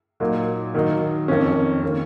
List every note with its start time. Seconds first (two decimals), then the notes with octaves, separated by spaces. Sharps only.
0.20 A#2 F#3 A#3 D#4
0.75 D#3 F#3 A#3 D#4
1.28 F2 D#3 A#3 C#4
1.83 D#3 A#3 C#4